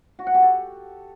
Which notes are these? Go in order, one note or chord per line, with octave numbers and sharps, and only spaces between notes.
F#4
F#5
G4
A4